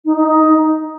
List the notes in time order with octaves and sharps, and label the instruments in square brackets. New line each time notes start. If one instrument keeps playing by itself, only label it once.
[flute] D#4
D#4
D#4